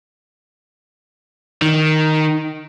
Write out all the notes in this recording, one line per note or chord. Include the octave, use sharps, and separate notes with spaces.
D#3